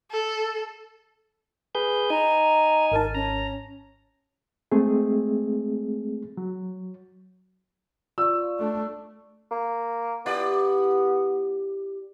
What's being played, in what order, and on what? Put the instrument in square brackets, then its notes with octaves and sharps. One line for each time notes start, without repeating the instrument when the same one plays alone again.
[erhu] A4
[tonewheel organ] G#4 B4 G6
[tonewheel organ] D#4 G#5 [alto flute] A#5
[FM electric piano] G#1 A5 [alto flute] A#4
[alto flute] C#4 [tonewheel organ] A#5
[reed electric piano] G#3 A3 C4 G#4
F#3
[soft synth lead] F4 [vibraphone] D5 C#6 [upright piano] E6
[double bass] A3 D4
[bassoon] A#3
[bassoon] B3 [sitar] E4 G4 D5